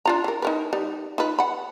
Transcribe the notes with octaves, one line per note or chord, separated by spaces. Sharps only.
D4 F4 A#5
E3 A#4
D#4 A#4 B4
G3 D#4
D#4 F4 B4
F#5 B5